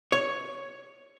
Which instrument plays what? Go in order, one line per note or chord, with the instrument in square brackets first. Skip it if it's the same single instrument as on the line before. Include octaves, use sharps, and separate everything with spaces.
[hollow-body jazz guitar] C#5